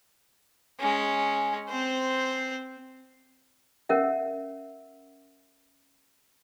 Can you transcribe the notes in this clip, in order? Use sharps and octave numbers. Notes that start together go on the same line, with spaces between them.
G#3 C#4
C4 C5
C#4 A#4 E5 F#5